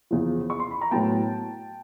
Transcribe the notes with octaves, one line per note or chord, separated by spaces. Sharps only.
E2 C#3 F3
C#6
C6
B5
A#5
A2 F#3 B3 G5 A5